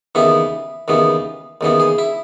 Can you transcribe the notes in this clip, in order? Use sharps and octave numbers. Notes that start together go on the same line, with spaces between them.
D#2 C#3 E3 B3 E4
D#2 C#3 E3 B3
D#2 C#3 E3 B3
G#4
E4